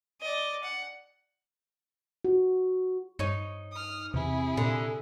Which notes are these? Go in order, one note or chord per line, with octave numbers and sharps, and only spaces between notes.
D5 D#5
F#5
F#4
G2 D#4 C#5
D#6 F6
E2 C3 E4 G#4
A#2 D3